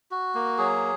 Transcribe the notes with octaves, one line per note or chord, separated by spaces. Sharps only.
F#4
A#3
F#3 G#4